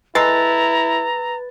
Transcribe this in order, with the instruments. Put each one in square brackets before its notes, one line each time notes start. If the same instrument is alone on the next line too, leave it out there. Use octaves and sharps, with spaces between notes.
[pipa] G#3 A4 [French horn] E4 [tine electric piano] B4 A6 [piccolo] A#5